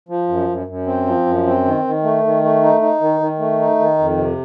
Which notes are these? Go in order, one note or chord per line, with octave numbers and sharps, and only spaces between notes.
F3
F#2
F#2
F#2
C4
F3
F#2
C4
D#3
D#3
A3
D#3
A3
D#4
D#4
D#3
D#3
A3
D#4
D#3
F2
C3